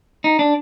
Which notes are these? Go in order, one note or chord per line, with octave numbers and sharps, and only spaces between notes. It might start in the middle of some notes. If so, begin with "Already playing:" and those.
D#4
D4